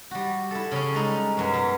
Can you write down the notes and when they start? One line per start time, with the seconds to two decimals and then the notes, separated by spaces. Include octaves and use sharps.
0.11 G3 F#4
0.51 E4 A4
0.72 C#3 C#4
0.93 G3 G#3 D#4
1.37 F#2 B2
1.54 B2